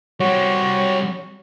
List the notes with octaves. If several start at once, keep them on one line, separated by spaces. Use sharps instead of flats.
G3 C4 F#4 C#5